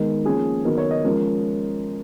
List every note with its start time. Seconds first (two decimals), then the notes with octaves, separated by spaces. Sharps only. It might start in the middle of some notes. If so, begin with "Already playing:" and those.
Already playing: D#3 G#3 B3 D#4 A#4
0.25 F3 A#3 C#4 G#4
0.64 D#3 F#3 B3 D#4 A#4
0.77 C#5
0.91 D#5
1.04 F3 G#3 C#4 A#4